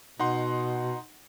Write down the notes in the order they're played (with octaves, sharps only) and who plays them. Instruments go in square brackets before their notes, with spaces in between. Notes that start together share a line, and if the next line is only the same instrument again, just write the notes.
[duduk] B2 [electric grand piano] D#4 F#5 C6